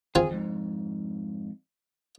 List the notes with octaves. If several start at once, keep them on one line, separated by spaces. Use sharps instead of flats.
C4 F4 G#4 G#5
F2 G#2